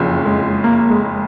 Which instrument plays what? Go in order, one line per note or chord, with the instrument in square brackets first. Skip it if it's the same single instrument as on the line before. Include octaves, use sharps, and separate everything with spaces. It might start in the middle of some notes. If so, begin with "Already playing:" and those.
Already playing: [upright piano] F#1 F2 C#3
[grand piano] G#3
A#3
G#3